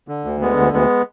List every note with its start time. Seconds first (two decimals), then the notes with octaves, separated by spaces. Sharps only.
0.08 D3
0.25 D2
0.41 D3 G#3 B3
0.57 D2
0.73 D2 G#3 B3